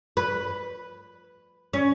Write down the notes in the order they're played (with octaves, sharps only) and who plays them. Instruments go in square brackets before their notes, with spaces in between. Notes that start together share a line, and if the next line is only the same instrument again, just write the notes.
[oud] B4
C#4